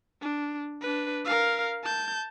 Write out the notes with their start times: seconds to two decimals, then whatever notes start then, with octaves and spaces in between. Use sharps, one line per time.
0.22 D4
0.81 D4 B4
1.25 A#4 F5
1.84 A5 G6